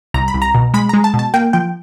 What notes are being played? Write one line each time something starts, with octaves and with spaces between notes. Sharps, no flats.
C2 A#5
B5
C2
A#5
B2
G#3 B5
G#3 A#5
A5
B2
A5
A#3 G5
F3 G5